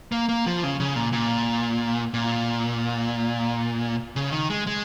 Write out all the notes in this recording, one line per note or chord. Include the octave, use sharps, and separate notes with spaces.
A#3
A#3
F3
C#3
C#3
A#2
A#2
A#2
C#3
D#3
G#3
G#3